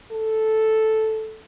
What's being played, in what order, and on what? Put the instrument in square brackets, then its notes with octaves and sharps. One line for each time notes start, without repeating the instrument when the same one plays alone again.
[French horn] A4